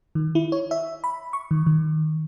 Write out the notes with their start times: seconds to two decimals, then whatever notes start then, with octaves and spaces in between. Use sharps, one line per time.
0.15 D#3
0.35 E4
0.52 C#5
0.71 E5
1.04 B5
1.33 C#6
1.51 D#3
1.66 D#3